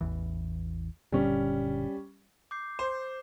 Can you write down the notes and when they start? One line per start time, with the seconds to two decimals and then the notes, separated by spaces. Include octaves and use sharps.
0.01 A1 E2 E3
1.12 F#1 A#2 D3 G3 C#4
2.51 D6 G6 C7
2.79 C5